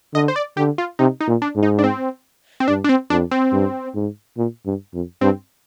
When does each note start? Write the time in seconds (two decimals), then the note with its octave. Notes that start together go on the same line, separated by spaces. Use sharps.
0.14 D3 D#5
0.28 C5
0.36 D5
0.57 D3 G4
0.78 F4
0.99 C3 D#4
1.21 D#4
1.27 A#2
1.42 D4
1.56 G#2
1.63 D#4
1.79 D4
1.84 C4
2.60 C4
2.68 G2 D4
2.84 D4
2.89 C4
3.10 F2 D4
3.31 C4
3.53 G2
3.95 G#2
4.37 A#2
4.66 G2
4.94 F2
5.21 G2 C4